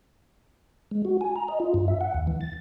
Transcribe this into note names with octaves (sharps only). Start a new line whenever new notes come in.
G#3
F#4
G#5
A#5
D#5
F4
G2
E5
F#5
D#2
E3
A6